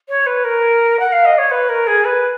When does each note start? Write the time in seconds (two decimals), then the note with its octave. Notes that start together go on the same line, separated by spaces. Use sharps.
0.09 C#5
0.26 B4
0.44 A#4
0.99 F#5
1.12 F5
1.25 D#5
1.38 C#5
1.51 B4
1.69 A#4
1.87 G#4
2.04 B4